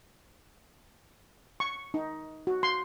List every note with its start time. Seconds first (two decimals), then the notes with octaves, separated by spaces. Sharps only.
1.60 C#6
1.94 D#4
2.47 F#4
2.63 C6